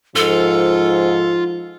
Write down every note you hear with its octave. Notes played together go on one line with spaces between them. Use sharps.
G#2 F3 F4 A4